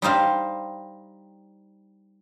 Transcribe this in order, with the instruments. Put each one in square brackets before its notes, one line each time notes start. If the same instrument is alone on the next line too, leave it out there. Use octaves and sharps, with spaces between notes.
[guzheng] G3 D#4 C5 F5